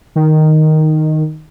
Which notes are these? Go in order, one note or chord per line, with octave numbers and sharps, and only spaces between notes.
D#3